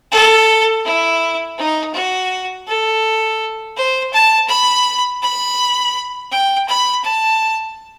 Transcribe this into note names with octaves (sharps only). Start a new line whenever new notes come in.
A4
E4
D#4
F#4
A4
C5
A5
B5
B5
G5
B5
A5